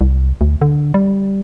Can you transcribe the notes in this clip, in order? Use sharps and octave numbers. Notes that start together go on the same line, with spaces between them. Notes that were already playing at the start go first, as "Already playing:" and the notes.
C2
D2
D3
G3